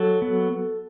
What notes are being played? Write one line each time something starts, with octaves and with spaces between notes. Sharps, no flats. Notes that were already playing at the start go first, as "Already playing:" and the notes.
Already playing: F#3 A4
B3